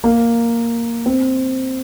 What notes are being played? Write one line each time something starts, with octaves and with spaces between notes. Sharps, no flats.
A#3
C4